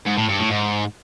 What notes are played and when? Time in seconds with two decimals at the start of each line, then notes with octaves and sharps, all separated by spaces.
0.07 G#2
0.18 A2
0.29 G2
0.39 A2
0.50 G#2